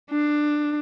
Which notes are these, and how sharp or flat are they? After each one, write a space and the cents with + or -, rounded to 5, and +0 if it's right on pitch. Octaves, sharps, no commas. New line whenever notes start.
D4 +15